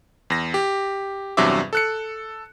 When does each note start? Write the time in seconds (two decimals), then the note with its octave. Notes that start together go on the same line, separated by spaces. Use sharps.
0.30 E2 A#6
0.54 G4
1.37 E2 G2 C3 F#3 E5 D6
1.73 A4 F#6 C#7